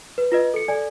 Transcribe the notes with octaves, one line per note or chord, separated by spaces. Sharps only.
B4
F4 B4 D#5
A4 C#7
A4 D5 G#5